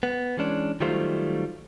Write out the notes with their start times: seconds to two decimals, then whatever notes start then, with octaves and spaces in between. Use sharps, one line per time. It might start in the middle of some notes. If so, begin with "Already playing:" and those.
0.03 B3
0.37 E3 G#3 C#4 D4
0.80 D#3 F#3 G3 A3 F4 C5